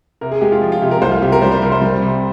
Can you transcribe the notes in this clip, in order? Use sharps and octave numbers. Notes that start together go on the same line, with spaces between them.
C3 A#4
G#4
G#3 G4
F4
F3
F4
C3 G4
A#4
C2 C5
F4
C3 G4
A#4
G3 C5
C5
C3 A#4
C5
G3
C3